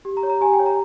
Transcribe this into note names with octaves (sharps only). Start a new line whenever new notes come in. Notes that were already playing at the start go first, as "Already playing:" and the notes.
G4
A#5
C#5
A#5
G4 G#5
G5
C#5
A#5